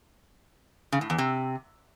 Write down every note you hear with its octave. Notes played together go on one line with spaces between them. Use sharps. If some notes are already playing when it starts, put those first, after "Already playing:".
C#3
A2
E2
C3